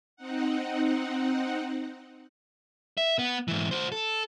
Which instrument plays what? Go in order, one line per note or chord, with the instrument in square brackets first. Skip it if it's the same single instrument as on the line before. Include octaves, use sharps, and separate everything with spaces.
[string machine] C4 D#4 F#5
[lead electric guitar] E5
B3 F#5
G#2 E3
F#4 C5
A4